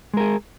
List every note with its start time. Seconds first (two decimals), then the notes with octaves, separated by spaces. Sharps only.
0.14 G#3
0.17 A#4
0.21 G#4